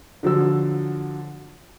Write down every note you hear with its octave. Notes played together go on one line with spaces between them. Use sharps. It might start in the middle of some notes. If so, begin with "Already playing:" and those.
D3 F3 F#3 E6